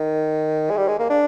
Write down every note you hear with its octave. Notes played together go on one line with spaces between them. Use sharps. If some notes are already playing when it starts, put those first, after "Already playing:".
Already playing: D#3
G#3
G3
G#3
A#3
D4